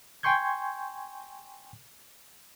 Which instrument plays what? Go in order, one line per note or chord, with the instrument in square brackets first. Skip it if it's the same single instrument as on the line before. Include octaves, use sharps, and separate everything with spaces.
[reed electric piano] G5 G#5 C6 C#6 G6 G#6